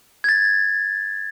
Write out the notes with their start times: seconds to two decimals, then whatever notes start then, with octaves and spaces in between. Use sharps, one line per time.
0.24 G#6
0.29 A6